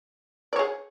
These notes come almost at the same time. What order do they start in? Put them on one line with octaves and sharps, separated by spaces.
D5 C#5 G#4